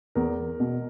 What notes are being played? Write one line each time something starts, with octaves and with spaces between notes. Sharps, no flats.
E2 A#4
B2